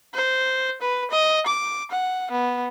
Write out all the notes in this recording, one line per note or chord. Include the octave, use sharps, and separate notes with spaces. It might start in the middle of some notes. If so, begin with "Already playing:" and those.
C5
B4
D#5
D6
F#5
B3